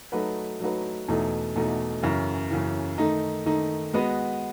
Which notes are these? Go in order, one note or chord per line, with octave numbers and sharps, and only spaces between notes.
F#3 A3 D#4 F#4 B4
F#3 A3 D#4 F#4 B4
E2 B2 A3 D#4
E2 B2 A3 D#4
F#2 C#3 E3
F#2 C#3 E3
D#3 A3 D#4
D#3 A3 D#4
G#3 B3 F#4 B4 D#5